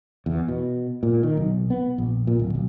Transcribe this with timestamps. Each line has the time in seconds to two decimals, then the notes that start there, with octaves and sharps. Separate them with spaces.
0.26 E2
0.48 B2
1.03 A#2
1.23 D#3
1.37 B1
1.70 B3
1.98 A#1
2.27 A#2
2.39 D1
2.55 B1